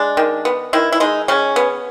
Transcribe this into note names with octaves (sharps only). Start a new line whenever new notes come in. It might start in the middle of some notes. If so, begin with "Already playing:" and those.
Already playing: G#3 D4
D#3
B3
D#3 E4
E4
G#3 D#4
C#3 C#4
B3